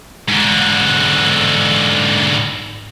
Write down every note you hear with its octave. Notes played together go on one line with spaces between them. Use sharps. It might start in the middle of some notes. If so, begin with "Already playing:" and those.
G#2 D3